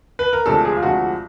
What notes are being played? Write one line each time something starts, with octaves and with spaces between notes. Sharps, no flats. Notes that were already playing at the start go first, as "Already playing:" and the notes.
B4
A#4
D2 C3 F3 G#3 A4
G#4
F4
D2 C3 F3 G#3 F#4